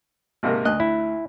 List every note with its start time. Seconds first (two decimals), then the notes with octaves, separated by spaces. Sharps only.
0.43 G#1 C3 A#3
0.65 D2 D#5 F#6
0.80 E4